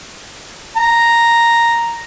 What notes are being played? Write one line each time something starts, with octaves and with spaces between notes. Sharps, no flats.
A#5